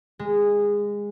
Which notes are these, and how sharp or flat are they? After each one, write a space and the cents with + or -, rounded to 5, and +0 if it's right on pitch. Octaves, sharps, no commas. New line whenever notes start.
G#3 -20